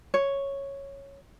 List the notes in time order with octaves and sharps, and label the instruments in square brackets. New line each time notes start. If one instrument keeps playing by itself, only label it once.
[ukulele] C#5